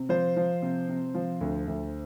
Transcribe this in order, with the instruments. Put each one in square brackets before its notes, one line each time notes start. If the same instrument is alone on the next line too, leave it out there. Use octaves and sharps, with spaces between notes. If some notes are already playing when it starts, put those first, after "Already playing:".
Already playing: [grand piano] C3
F3 C5
F3
C3
C3
F3
D2
D2